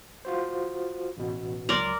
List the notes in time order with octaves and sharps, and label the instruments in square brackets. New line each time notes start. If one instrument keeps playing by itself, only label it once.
[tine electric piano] F4 F#4 C5
A1 B2
[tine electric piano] C#2 F#3 C6 [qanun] A#4 D5